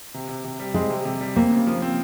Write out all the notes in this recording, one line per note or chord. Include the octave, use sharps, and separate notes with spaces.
C3
C3
C3
G3
G#3 C4
C3
C3
G3
A#3 C4
C#3
F3
C4